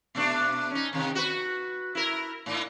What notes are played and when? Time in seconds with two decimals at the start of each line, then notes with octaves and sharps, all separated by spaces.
0.15 B2 A3 D4
0.71 C#4 D#4
0.93 C3 D#3
1.15 F#4 B4
1.95 E4 A#4
2.46 A2 D#4